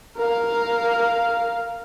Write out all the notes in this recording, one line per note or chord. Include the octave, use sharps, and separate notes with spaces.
A#4 F5